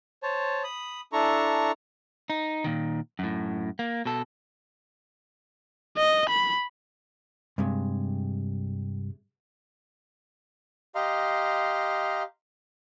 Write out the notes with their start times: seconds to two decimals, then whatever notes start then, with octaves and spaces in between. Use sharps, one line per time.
0.23 C5 C#5 A5
0.64 B5 D#6
1.13 D4 E4 A4 A#5 C#6
2.30 D#4
2.64 A#2 D#3
3.19 F#2 A2
3.79 A#3
4.06 B2 A4
5.97 D#5
6.30 B5
7.58 G2 C3 G#3
10.95 G4 D#5 F5 A#5 C6